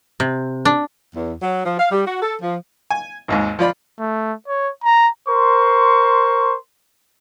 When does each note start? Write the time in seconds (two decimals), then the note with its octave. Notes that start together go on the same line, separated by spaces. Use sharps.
0.20 C3
0.65 D4
1.16 E2
1.42 F#3
1.66 F3
1.80 F5
1.92 G3
2.07 F#4
2.22 A4
2.41 F3
2.90 G#5
3.28 G#1 D#2 G#2
3.59 F3 F4 D5 B5
3.99 A3
4.48 C#5
4.84 A#5
5.28 A#4 C5 C6 C#6